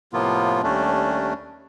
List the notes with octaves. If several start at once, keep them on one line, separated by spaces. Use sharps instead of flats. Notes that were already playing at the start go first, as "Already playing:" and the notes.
A2 C3 F3 A#3 B3 F4
D#2 G3 A3 C#4 D4